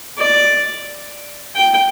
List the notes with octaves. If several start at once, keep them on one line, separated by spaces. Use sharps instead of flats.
D5
G5